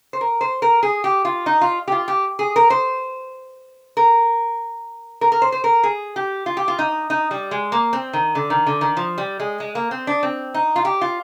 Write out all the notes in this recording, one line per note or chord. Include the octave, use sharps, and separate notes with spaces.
C5
A#4
C5
A#4
G#4
G4
F4
D#4
F4
G4
F4
G4
G#4
A#4
C5
A#4
A#4
A#4
C5
C5
A#4
G#4
G4
F4
G4
F4
D#4
D#4
G3
G#3
A#3
C4
D#3
D3
D#3
D3
D#3
F3
G3
G#3
G#3
A#3
C4
D4
C4
D#4
F4
G4
F4